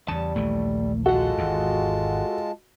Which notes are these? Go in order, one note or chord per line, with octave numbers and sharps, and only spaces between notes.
E2 C#3 G3 A5
A#1 D#2 E3 A3
G#3 F4 F#4 A4 F#5 A5
G#1 E2